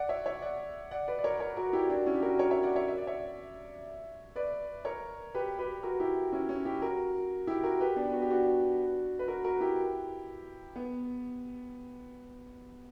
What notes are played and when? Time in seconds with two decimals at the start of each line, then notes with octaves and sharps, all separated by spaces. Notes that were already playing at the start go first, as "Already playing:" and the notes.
Already playing: D5 F#5
0.09 C#5 E5
0.26 C#5 E5
0.42 D5 F#5
0.91 D5 F#5
1.08 B4 D5
1.19 D5
1.24 A#4 C#5
1.40 A#4 C#5
1.57 F#4 A#4
1.73 E4 G4
1.89 D4 F#4
2.06 C#4 E4
2.14 G4
2.22 F#4 A#4
2.39 A#4 C#5
2.51 C#5 E5
2.63 D5 F#5
2.76 C#5 E5
2.88 E5
2.98 D5
3.07 C#5 E5
4.36 B4 D5
4.85 A#4 C#5
5.34 G4 B4
5.59 G4 B4
5.83 F#4 A#4
6.00 E4 G4
6.33 C#4 E4
6.49 C#4
6.65 E4 G4
6.82 F#4 A#4
7.47 E4 G4
7.63 F#4 A#4
7.80 G4 B4
7.96 B3 D4
8.13 F#4
8.22 G4
8.30 D4 F#4
9.19 B4
9.28 F#4 A#4
9.44 F#4 A#4
9.61 E4 G4
10.76 B3